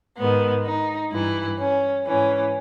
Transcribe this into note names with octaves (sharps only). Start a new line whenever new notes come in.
G#2 D#3 B3
D#4
G2 E3 E4
C#4
G#2 E3 C#4